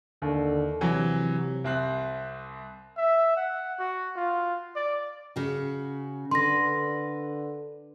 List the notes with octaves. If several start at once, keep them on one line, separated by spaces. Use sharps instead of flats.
D#2 D3
C3 E3 F#3
C2 C4 F#6
E5
F#5
F#4
F4
D5
C#3 F#4
D3 B4 C6 A#6